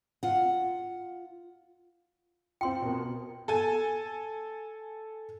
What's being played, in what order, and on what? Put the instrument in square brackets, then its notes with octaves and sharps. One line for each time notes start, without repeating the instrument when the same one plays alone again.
[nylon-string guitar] F4 F#5
[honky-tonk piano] C4 F4 [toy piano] G5 C6
[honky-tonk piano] B2 A#4
A4 G#5